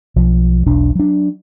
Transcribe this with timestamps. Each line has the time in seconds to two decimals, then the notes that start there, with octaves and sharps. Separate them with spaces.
0.16 B1 F3
0.66 E1 B1 D4
0.95 F#3 D4